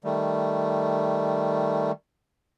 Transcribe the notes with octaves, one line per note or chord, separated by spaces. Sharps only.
D#3 G3 A3